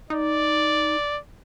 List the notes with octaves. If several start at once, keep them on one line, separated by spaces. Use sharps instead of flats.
D#4 D5